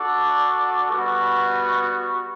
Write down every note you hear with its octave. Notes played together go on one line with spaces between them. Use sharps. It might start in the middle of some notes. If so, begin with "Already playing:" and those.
Already playing: D4 F#4 A4 D5
G3 B3 F#4